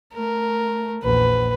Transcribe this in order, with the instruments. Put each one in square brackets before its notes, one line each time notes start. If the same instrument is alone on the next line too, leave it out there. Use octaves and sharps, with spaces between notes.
[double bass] A3 [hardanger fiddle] A#4
[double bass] A#1 E2 [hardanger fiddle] B4